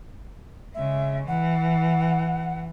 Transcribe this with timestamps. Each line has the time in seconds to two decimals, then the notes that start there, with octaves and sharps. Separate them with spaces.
0.75 C#3 G#3 E5
1.28 E3 F#5